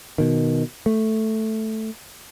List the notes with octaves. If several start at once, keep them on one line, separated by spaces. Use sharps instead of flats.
B2 D#3
A3